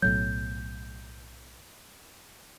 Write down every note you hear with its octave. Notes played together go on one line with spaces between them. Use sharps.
B1 A2 F#3 G6